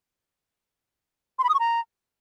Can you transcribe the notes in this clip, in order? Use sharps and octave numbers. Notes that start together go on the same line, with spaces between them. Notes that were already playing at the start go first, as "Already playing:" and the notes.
C6
B5
D#6
C#6
A#5